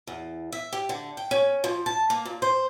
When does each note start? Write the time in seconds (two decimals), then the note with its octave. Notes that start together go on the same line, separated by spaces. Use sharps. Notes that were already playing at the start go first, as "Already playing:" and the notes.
0.07 E2
0.52 E5
0.73 G4
0.89 D3
1.17 G5
1.31 C#4
1.64 F3
1.86 A5
2.10 A#3
2.25 A#2
2.42 C5